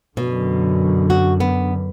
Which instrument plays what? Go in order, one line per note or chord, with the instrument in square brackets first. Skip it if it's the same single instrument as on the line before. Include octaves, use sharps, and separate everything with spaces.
[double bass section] F#2 D3 [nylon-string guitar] B2
[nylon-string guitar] F#4
B3